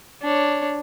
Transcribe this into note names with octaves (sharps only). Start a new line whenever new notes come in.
D4 C#5